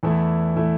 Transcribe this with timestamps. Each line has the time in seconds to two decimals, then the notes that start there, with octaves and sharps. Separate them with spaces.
0.03 E2 E3 A3 E4
0.56 E3 A3 E4